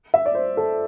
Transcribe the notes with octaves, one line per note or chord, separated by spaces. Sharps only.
E5
D5
C5
A4